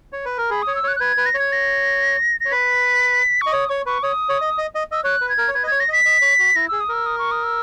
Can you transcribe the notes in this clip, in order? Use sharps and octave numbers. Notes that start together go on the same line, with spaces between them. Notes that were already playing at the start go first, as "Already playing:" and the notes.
C#5
B4
A#4
G#4 B5
C#5 D#6
E6
C#5 F#6
F#6
B4 G#6
B4
A#6
C#5 G#6
A#6
A#6
C#5
B4 B6
C#6
D#5
C#5 D#6
C#5 C#6
B4 C#6
C#5 D#6
C#5
D#5
D#5
D#5
D#5 E6
C#5 F#6
B4
G#6
A#4
C#5
B4 G#6
D#5
C#5 G#6
A#6
D#5 B6
D#5
C#5
F#4
E4 A#6
G#4 E6
D#6
A#4 E6
D#6
C#6
D#6
E6